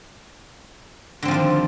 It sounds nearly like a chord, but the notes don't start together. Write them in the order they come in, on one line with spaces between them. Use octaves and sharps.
D3 C4 F3 D#3 G3